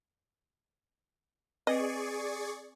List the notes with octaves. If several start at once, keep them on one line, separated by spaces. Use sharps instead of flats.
C4 G#4 B4 D5 D#5 C#6